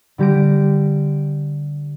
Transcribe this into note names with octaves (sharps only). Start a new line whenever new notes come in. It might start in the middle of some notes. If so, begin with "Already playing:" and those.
D3 G3 G4 A#6 D7